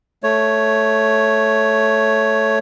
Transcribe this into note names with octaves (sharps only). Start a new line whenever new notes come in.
A3 C#5